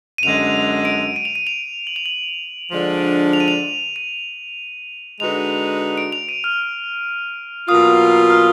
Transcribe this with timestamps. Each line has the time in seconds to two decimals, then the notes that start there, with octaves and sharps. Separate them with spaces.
0.18 D#7
0.22 F#2 D3 G#3 F7
0.85 D7
1.16 D#7
1.25 F7
1.35 D#7
1.47 F7
1.87 F#7
1.96 F7
2.06 F#7
2.71 D3 F3 G#3 D4
3.33 F7
3.40 D#7
3.48 F7
3.96 D#7
5.20 D3 G#3 D#4 F#4 B4 F7
5.97 D7
6.12 F7
6.29 D#7
6.44 F6
7.68 B2 F#3 A#3 F4 D#6
8.30 F6